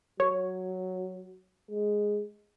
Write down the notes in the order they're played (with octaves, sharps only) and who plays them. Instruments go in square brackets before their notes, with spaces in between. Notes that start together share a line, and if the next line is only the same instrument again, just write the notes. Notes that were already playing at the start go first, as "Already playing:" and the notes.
[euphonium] F#3 [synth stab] C#5
[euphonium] G#3